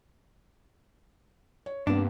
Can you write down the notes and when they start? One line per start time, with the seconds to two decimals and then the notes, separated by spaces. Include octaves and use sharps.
1.66 C#5
1.87 G2 C3 A#3 B3 D4